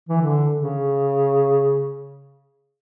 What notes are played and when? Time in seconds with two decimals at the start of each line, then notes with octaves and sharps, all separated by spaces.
0.09 E3
0.21 D3
0.56 C#3